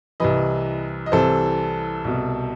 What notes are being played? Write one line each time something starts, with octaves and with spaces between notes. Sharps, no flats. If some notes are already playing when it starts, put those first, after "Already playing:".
C2 C3 E3 B4 D#5
D#5
C2 C3 E3 A4 C5
C2 B2